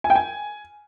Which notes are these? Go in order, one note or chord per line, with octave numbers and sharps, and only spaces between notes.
G#5
G5
G#5